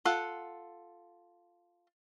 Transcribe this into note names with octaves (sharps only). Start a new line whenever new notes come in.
F4 A4 F#5